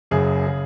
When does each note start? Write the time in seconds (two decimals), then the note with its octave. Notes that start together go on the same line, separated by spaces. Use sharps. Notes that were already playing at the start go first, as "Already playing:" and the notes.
0.11 F#1 F#2 C#3 F#3 G#4
0.47 C#3